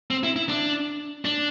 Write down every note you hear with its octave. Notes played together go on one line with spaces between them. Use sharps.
C4
E4
E4
D4
D4